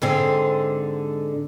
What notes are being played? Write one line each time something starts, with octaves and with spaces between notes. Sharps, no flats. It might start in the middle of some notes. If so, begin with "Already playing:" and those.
G#2 D3 C4